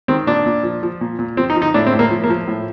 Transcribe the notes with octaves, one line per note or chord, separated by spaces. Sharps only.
D#3 C4
A#2 D4
A#2
F3
F3
A#2
A#2
F3 C4
D#4
F3
D#4
A2 D4
C4
A2
A#3
F3
A#3
F3
A2